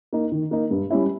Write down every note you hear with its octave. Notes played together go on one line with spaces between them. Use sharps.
A#3 D#4
D#3
A#3 D#4
G2
G3 C#4 E4